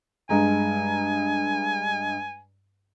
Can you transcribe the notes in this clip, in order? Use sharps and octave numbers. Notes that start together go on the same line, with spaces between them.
G2 G#3 G#5 A#5